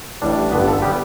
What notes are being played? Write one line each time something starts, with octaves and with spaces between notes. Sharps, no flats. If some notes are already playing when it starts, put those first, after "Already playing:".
A1 A2 G3 D4
G1 G2 D3 B3 B4
A4
G3 B3 G4